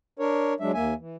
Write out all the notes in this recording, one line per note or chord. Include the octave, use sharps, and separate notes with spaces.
D4 A#4 C#5
F#3 G#3 D4 E5
D#2 A#3 E5 G#5
E3